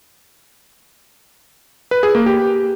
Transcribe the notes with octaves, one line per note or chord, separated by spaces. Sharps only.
B4
G#4
A#3
G4